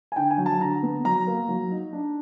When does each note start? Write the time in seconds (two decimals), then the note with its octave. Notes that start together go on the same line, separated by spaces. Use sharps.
0.12 G#5
0.16 D3 G5
0.31 G#5
0.38 F#3
0.46 A5
0.60 D3 A#5
0.83 B3
1.05 F#3 A#5
1.27 A#3
1.49 F#3
1.72 D#4
1.93 D4